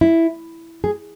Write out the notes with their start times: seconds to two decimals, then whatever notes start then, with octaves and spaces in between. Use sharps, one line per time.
0.01 E4
0.84 G#4